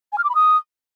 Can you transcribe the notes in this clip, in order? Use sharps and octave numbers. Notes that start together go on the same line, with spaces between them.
G#5
F6
D6
B5
D#6